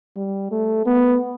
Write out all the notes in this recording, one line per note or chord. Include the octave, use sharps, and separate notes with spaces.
G3
A3
B3